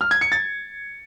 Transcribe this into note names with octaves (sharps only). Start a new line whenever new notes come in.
F6
G#6
C#7
A6